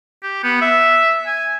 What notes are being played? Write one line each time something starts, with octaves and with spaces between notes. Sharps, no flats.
G4
B3
E5
G#5